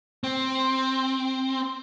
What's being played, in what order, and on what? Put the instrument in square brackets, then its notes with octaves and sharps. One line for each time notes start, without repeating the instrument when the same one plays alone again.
[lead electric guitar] C4